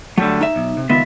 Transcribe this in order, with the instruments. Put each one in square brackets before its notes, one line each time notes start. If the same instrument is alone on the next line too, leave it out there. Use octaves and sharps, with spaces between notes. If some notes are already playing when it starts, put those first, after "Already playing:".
[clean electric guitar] D3 G3 A3 [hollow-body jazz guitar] F#3
[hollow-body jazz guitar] D#4 E5
[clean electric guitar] B1
C3
[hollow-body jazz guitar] C#2 B3 [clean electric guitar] D#3 F4 E5